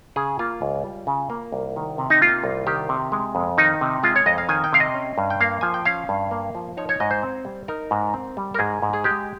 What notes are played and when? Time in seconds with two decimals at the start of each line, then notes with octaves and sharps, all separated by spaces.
0.16 C#3 G#4
0.39 A#3 F4
0.62 C#2
0.84 G3
1.07 C#3
1.30 A#3
1.52 C2
1.76 D#3
1.98 C3
2.10 D#4
2.21 A#3 F4
2.44 C2
2.67 D#3 G4
2.89 C3
3.12 G#3
3.35 F2
3.58 D#3 D#4
3.81 C3
4.03 G#3 F4
4.16 C#5
4.26 F2 D#5
4.38 F5
4.49 D#3 G#5
4.64 G5
4.73 C3 F5
4.80 D#5
4.94 C#4
5.18 G2
5.30 G5
5.40 A#3 F5
5.61 F3 G#5
5.74 G5
5.85 C#4 F5
6.09 G2
6.31 A#3
6.55 F3
6.77 D#4 C#5
6.89 C#5
7.00 G#2 D#5
7.11 C5
7.23 C4
7.45 G3
7.68 D#4 A#4
7.91 G#2
8.14 C4
8.37 G3
8.54 A#4
8.59 G#2 G#4
8.82 G#2
8.93 G#4
9.04 G#3 G4